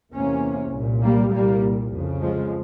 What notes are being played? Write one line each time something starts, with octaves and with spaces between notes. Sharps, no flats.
E2 C3 A#3 C#4
C2 A#2
G3 A#3
C2 A#2 G3 A#3
F2 C#3
F3 G#3